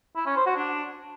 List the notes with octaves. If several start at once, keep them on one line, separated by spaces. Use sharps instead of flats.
E4
C#4
C5
F#4
D4